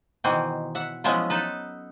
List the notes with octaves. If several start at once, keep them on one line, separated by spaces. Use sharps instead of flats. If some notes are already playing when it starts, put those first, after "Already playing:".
B2 D#3 E3 C4
E5 F#5
F3 F#3 G#3 B3 C#4 E4
D#4 A4 B4